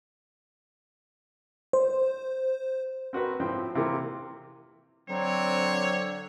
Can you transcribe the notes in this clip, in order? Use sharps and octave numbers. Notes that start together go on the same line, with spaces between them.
C5
C4 F#4 A#4 B4
A2 F3 C4
C3 E3 A#3
D3 F#3 C4 C#5